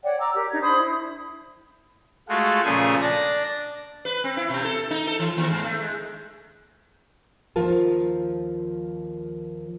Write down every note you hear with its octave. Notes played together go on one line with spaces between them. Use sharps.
C#5 D5 F#5 G5
D5 A#5 D6 E6
G4 A#4
D4 D#4 G#6
D4 C5 B5 D#6
E4
G#3 A3 F4 F#4
A#2 C#3 F3 A3 G#4 G#5
D4 D5 A#6
B4
C4
E4
B2
A4
D#4
A4
E3
D#2
G#2
A3
G#3
D#2 F3 F4 A#4 A5